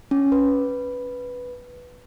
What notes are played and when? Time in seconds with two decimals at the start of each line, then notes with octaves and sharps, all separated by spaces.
0.11 C#4
0.32 B4